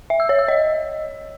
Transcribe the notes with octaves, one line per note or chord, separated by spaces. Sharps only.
E5
E6
C#5
E6
D#5